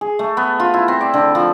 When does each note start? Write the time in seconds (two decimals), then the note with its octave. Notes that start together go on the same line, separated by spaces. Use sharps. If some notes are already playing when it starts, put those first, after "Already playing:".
0.01 G#4
0.19 A3
0.37 B3
0.60 F4
0.74 E4
0.88 C4
1.01 D5
1.14 D3
1.35 F3